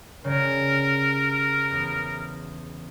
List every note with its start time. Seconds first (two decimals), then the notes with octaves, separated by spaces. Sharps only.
0.24 C#3 G3 C#4 A#4
1.71 E2